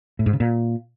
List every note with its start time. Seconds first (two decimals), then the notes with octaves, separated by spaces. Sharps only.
0.19 A2
0.26 G#2
0.33 C#3
0.40 A#2